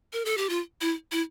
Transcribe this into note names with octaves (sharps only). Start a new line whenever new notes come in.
A#4
A4
G4
F4
E4
E4